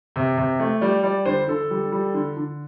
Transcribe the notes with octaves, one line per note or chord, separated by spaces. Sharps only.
C3
C3
A3
G3 D5
G3 D5
D3 C5
D3 A4
G3
G3
D3
D3